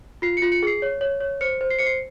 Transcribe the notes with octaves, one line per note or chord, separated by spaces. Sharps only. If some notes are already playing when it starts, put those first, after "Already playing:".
F4 C7
C#7
F4
C#7
G#4 C7
C#5
C#5
C#5
C5 C#7
C5
C7
C5 C#7
C7